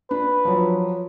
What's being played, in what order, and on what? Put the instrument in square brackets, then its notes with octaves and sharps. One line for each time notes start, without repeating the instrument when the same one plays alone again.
[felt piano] D4 [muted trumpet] B4
[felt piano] F3 F#3